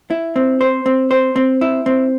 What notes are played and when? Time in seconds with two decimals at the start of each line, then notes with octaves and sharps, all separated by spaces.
0.10 E4
0.36 C4
0.61 C5
0.86 C4
1.11 C5
1.36 C4
1.61 E4
1.86 C4